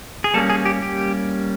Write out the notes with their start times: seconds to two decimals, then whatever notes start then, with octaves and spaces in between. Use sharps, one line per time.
0.24 G#4
0.34 G3 A#3 C#4 A4
0.50 G#4
0.65 G4
0.82 G4